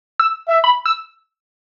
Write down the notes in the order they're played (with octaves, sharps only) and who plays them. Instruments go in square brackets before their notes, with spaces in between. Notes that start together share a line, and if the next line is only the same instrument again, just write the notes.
[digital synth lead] E6
[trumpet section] E5
[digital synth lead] B5
E6